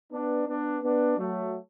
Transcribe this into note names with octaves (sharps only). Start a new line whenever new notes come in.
B3 D4
B3 D4
B3 D4
F#3 A3